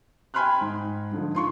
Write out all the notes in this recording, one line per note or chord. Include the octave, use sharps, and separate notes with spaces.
G5 G#5 B5 C6 F6 F#6
G#2
G#2 D3 F3
F4 C6 C#6